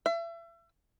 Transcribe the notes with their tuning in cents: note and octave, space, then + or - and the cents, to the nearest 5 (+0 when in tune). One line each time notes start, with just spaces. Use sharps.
E5 +35